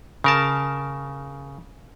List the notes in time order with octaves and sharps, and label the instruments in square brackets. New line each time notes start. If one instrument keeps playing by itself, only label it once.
[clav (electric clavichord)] C#3 A#4 A5